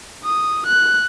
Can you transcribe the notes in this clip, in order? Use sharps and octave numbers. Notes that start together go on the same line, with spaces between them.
D#6
F#6